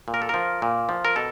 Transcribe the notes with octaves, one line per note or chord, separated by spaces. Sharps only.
A#2
A#4
A4
F3 A#4
A#2
F3
A#4
B2 A4